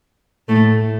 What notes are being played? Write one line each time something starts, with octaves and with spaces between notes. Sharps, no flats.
A2 A3